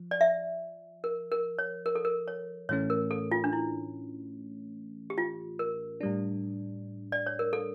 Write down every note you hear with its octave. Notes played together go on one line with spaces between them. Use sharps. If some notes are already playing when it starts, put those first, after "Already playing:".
Already playing: F3
D5
E5
A#4
A#4
C#5
A#4
A4
A#4
C#5
A2 E3 A3 C#4 C#5
A#4
A4
F4
D4
E4
G4
F4
A#4
A2 G3 D4
D5
C#5
A#4
A4